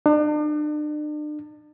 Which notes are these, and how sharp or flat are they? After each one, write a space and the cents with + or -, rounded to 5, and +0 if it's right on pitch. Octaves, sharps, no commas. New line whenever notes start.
D4 +40